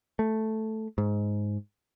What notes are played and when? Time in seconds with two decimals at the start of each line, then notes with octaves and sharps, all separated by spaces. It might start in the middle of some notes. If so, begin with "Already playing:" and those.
0.19 A3
0.98 G#2